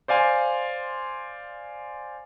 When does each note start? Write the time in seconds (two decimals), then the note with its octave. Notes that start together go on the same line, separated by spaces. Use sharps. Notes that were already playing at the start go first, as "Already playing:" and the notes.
0.08 C5 D5 F5 G#5 C6